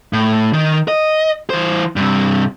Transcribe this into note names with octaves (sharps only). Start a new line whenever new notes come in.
A2
D#3
D#5
E3 C5
G2 C3